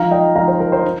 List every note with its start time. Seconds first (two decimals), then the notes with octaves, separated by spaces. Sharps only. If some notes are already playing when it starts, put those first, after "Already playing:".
Already playing: F3 D#4 F5 A#5
0.11 D#5 G5
0.36 F3 D#4 F5 A#5
0.48 C5
0.60 A#4
0.72 C5
0.84 D#4